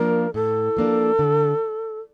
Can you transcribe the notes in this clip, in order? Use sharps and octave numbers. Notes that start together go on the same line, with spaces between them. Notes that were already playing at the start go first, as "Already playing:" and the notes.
Already playing: F3 A#3 D4 A#4
A2 A4
F3 A#3 D4
D3